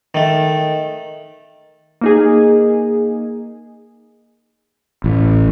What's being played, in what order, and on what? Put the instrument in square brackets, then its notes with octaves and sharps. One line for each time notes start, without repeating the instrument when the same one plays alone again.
[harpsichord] D#3 A3
[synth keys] A#3 D#4 G#4
[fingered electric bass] A1